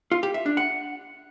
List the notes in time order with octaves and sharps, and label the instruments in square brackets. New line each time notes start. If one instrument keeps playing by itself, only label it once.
[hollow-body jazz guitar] F4
G4
E5
D4
F#5